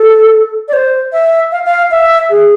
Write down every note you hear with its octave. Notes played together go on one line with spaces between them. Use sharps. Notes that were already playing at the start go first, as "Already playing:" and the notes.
Already playing: A4
D5
C5
E5
F5
F5
E5
G#4